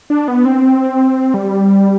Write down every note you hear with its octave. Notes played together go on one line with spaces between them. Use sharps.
D4
B3
C4
G3